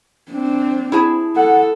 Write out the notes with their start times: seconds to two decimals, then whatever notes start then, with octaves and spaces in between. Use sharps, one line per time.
0.31 C4 D4
0.92 E4 G#4 A5
1.36 A4 F#5